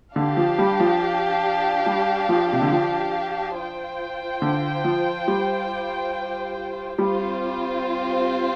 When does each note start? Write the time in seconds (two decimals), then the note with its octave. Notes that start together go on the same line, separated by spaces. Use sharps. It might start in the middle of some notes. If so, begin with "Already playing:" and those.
0.16 D3 D4 G4 F5 A5
0.37 F3
0.59 G3
0.80 F3
1.86 G3
2.29 F3
2.53 C3
2.62 D3
2.72 F3
3.56 F4 C5 G5
4.42 D3
4.84 F3
5.28 G3
6.98 G3 C4 F4 C5